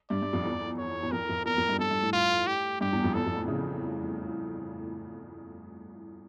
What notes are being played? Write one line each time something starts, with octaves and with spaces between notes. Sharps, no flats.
G2 D5
G2
F2
E2
C#5
E2
F2 A#4
F2
E2 A#4
F2
G2
G2 A4
G2
A2
F4
G4
G2 G4
E2
F2
E2 A4
F2
A2
C#3